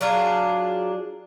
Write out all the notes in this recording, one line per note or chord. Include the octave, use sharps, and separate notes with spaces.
F#3 D4 F4 G#4